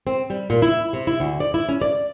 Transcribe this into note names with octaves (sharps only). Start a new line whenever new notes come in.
C4
G3
A#2
E4
C3
E4
D2
D5
E4
C#4
D5